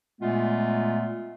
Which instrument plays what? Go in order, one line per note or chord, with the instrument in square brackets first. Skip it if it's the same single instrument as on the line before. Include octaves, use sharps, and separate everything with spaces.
[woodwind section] A#2 G#3 A3 B3 F4